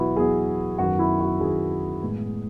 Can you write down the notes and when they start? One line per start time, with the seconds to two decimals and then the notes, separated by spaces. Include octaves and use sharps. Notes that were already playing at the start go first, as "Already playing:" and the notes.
Already playing: E2 B2 F#3 B3 E4 F#4
0.16 E2 B2 F#3 B3 G#4
0.78 F#2 D#3 F#3 B3 F#4
0.99 E4
1.20 F#4
1.40 F#2 D#3 F#3 B3 G#4
2.01 A2 G#3 B3